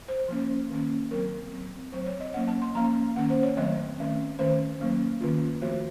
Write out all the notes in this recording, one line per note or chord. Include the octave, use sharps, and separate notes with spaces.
C5
F3 A#3 C#4
D#3 A#3 C#4
F#3 C4 A#4
F#3 C4
F#3 A3 C4 C5
C#5
D#5
F#3 A#3 C#4 F#5
A5
C6
F3 A#3 C#4 A#5
D#3 A#3 C#4 F#5
C5
C#5
D#3 F#3 A3 C4 D#5
D#3 A3 C#4
D#3 A3 C#4 C5
F#3 A#3 C#4
D#3 A#3 C#4 F4
F3 A3 C4 F#4